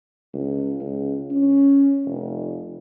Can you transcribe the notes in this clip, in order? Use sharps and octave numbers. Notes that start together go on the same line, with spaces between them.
C#2
C#2
C#4
F1